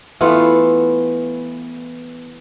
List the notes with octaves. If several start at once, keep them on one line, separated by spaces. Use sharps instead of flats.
E3 A3 B3 F4